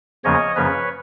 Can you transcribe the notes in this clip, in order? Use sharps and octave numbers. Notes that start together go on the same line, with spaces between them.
E2 C#3 F3 A#3 C#4 C#5 D#5
F#2 C#3 F3 A#3 C#4 B4 C#5